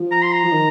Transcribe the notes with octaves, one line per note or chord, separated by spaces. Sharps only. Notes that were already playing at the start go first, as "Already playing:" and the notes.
Already playing: F3
A#5
C6
A#5
F3
D#3